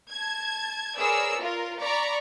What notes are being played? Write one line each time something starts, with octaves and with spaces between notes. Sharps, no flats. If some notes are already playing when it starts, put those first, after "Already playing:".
A5 G#6
G#4 A#4 B4 C#5 D5 E6
F4 A#4
D5 A#5 B5 C#6